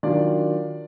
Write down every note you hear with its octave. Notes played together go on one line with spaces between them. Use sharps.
D#3 F#3 D4 F4 D5